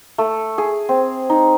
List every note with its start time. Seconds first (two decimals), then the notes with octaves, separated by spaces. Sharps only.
0.18 A3
0.58 G#4
0.89 C4
1.30 D#4